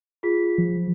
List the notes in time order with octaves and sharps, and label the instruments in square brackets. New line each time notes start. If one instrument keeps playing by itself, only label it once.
[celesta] F4 G#4 B6
[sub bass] F3